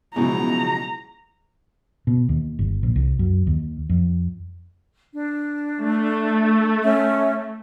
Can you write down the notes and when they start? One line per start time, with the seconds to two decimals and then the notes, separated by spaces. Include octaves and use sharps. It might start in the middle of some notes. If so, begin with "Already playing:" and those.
0.16 C#2 B2 F3 F#3 G#3 E4 A#5
2.07 B2
2.29 D#2
2.59 G1
2.83 A#1
2.96 C2
3.19 F#2
3.47 D#2
3.89 F2
5.14 D4
5.82 A3
6.83 C#4 E5